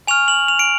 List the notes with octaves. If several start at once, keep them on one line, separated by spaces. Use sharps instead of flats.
G#5 C#6 F6 F7
F#7
F7
D7